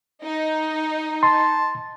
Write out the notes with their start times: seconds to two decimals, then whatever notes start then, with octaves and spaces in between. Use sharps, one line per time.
0.24 D#4
1.23 A5 C6